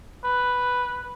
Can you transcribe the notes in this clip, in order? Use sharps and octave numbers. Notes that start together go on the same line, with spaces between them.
B4